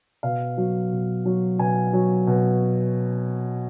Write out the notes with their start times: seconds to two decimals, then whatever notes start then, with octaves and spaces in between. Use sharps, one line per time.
0.23 B2 F5
0.58 F#3
0.92 B2
1.25 F#3
1.59 B2 G#5
1.93 F#3
2.27 B2